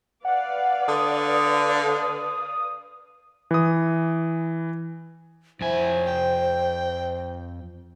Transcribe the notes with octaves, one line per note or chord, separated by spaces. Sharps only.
B4 D5 F5 F#5
D3 D#6
E3 D#6
F2 E4 C5 G#5
G5